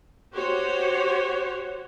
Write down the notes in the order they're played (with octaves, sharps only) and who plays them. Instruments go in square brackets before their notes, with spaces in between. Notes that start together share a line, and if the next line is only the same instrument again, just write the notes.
[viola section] F#4 G4 C5 C#5